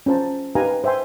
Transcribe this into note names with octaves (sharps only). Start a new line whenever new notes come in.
C#4 F4 C5 A5 A#5
D#4 G4 B4 F5 G#5 A#5
C5 E5 G5 G#5 C6